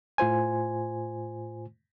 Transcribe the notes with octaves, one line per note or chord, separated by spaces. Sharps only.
A2 F4 C5 G#5